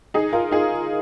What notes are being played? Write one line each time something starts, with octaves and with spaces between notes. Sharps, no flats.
D#4 G#4
F4 A#4
D#4 G#4